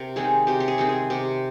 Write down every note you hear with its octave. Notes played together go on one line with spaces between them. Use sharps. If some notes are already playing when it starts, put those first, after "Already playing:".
Already playing: C3 A#4
D#3 G#3 C4 G#4
C3 G4
G4
G#4
D#3 G#3 C4
G#4
C3 G4